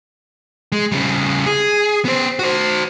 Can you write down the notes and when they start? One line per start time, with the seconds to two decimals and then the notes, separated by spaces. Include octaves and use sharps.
0.72 G#3
0.92 C#3 G3
1.46 G#4
2.05 B3 C5
2.39 F#4 C5